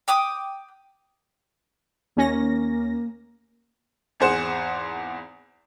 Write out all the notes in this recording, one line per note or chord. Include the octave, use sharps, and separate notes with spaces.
G5 D6 D#6
D#2 A#3 C#4 A#6
G#1 E2 G#4 C5 F#5 E7